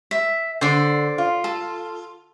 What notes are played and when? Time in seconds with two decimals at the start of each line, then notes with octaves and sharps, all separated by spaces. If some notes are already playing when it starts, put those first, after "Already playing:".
0.11 E5
0.61 D3 C5 D5
1.18 F4
1.44 A4